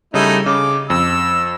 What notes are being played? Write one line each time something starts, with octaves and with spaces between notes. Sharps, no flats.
C#3 G3 A3 D#4 E4
C#3 D6
F2 E6